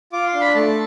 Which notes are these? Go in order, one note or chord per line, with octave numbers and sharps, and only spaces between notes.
F4 D6
C6
D4
B5
A3 A5